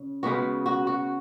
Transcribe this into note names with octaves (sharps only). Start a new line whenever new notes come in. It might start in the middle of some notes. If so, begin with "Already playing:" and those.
Already playing: C#3
C#3 G#3 B3 F#4
F#4
F#4